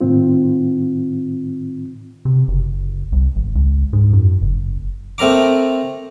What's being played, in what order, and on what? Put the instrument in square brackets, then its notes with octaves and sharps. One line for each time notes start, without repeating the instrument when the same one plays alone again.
[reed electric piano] A2 D#3 C4 F4
[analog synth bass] C3
F#1
C2
G#1
C#2
G#2
F#2
F#1
[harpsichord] A3 C4 A#4 A#5 D6